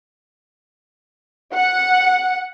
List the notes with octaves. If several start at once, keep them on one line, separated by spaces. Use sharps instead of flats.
F#5